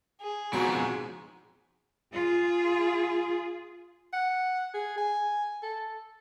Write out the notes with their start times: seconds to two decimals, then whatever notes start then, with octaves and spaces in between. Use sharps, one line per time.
0.21 G#4
0.53 F2 G#2 B2 F#3 F#4
2.13 F4 G#4
4.13 F#5
4.74 G#4
4.97 G#5
5.63 A4